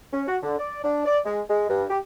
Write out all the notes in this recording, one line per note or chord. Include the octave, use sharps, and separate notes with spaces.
C#4
F#4
D3
D5
D4
D5
G#3
G#3
G2
G4